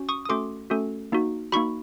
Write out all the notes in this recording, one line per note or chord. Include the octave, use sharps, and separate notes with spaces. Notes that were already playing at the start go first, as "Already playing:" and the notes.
Already playing: C#4 F#4
C#6 D#6
D#6
A3 C#4 F#4 A4 C6 D6
A3 C#4 F#4 A4
A#3 D#4 F#4
A#3 D#4 F#4 B5 C#6